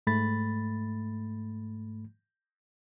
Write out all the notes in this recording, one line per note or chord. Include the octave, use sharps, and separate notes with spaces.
G#2 A3 B5 A6